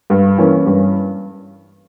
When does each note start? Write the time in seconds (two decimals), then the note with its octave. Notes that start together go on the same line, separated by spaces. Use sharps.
0.10 G2
0.38 E3 A#3 C#4
0.66 G2